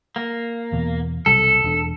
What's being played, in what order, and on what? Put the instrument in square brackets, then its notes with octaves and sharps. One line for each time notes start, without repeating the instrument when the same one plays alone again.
[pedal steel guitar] A#3
[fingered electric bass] E2 B2
[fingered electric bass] B1 C3 G3 [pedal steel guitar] A4
[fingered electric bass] E1 D4